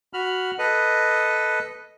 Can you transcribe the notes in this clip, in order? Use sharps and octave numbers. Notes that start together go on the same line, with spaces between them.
F#4 B5 F6
A4 B4 D#5